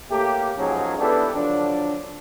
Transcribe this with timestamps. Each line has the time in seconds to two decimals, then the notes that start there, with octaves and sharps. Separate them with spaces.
0.11 A2 A3 A#3 G4
0.58 A1 G#2 F3 F#3 C#4 G#4
0.99 B3 D4 E4 G4 A4 B4
1.34 D3 F3 F#3 D4